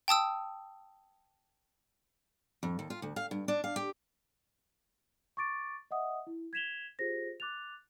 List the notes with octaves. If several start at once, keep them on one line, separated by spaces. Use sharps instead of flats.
G5 A5 D#6 E6
F2
D#2
F4
D2
F5
G2
D4
F5
G4
C#6 D6 A6 D7
D#5 E5 F#5 D#6
E4
G#6 B6 E7 F7 G7
F4 G4 G#4 C5 A#6
D6 F#6 A6 F7